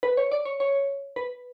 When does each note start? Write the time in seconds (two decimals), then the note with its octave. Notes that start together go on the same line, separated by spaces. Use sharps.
0.03 B4
0.17 C#5
0.32 D5
0.45 C#5
0.60 C#5
1.16 B4